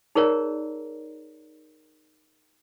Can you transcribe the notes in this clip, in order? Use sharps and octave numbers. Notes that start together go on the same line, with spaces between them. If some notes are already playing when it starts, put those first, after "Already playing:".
D#4 G#4 A#4 C#5 D5 A#5